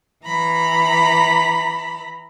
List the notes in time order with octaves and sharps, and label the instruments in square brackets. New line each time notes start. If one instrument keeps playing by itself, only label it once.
[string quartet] E3 A#5 B5